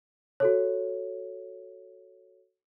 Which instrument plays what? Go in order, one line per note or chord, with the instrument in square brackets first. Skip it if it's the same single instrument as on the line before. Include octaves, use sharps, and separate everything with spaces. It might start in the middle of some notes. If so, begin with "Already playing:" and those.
[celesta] F#4 A4 C#5